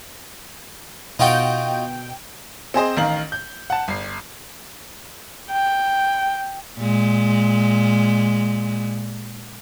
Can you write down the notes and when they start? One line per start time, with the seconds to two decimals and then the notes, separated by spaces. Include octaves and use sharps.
1.19 B2 D#4 F4 F#4 G5
2.74 C4 G#4 C5 D#5
2.97 A1 D#3 A#4 F5 F#7
3.32 G6
3.70 F#5 A5
3.88 G1 C7
5.51 G5
6.79 A#2 G#3